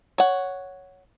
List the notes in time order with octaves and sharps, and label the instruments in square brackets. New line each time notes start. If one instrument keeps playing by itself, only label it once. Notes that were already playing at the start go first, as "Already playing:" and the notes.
[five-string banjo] C#5 F#5